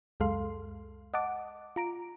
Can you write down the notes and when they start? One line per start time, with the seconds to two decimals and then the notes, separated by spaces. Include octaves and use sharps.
0.20 C#2 F#2 G#3 A4 F5 C6
1.14 D#5 F#5 A5 D6
1.76 F4 A#5 D7